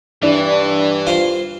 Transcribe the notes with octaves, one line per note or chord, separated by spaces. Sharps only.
G2 E3 D4 E4
F4 C5